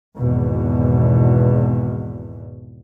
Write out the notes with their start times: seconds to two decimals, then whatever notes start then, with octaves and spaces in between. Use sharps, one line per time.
0.17 G#1 E2 B2